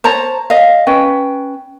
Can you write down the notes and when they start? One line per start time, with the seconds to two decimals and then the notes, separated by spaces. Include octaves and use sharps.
0.04 C5 C#5 A5 A#5
0.50 D#5 F5
0.87 C#4 B4 G5